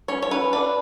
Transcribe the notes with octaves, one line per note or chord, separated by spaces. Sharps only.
C#4 C#5
C#5
C#4 B4
D4 B4